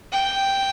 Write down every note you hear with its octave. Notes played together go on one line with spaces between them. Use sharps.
G5